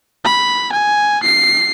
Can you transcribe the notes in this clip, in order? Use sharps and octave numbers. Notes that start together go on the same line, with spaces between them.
B5
G#5
C7